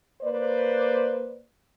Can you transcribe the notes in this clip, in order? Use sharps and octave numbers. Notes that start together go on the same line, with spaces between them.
A#3 B4 C5 D5